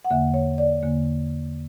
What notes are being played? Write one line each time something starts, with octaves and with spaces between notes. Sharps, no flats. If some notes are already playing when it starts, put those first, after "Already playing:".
F#5
E2 D3 A#3 E5
C#5
D5
E2 D3 A#3